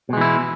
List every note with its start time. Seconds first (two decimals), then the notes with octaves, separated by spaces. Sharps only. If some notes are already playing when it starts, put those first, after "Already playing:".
0.09 B2
0.13 G#3
0.17 E3
0.21 E4